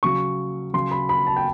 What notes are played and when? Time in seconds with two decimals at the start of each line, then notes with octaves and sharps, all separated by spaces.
0.03 C#3 F#3 C#6
0.73 C#3 F#3 C6
0.91 B5
1.09 B5
1.27 A5
1.36 G5